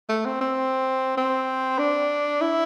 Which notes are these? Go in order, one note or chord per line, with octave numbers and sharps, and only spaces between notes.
A3
C4
C4
C4
D4
E4